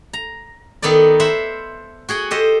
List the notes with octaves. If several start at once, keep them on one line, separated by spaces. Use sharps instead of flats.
A#5
D#3 B3 D#4 A4 D5
C5 E5 F#5 B5
F#4 G#4 F#5 G5
G4 A4 C5 D#5